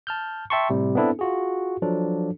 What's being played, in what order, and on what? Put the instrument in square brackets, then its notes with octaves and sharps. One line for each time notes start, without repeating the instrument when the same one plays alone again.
[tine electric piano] A5 F6 G6
E5 G5 A5 C6 C#6
A2 C3 G3
B3 C4 D4 E4 A4
F4 F#4 G#4
F3 F#3 D4 A4